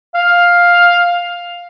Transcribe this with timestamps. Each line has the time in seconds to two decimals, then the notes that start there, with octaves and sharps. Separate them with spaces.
0.15 F5